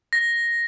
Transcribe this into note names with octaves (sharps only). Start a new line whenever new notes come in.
A#6